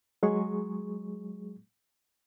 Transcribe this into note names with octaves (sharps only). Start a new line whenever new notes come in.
F#3 G#3 G#4 C#6